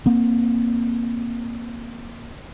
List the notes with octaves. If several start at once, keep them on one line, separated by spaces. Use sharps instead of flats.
A#3 C4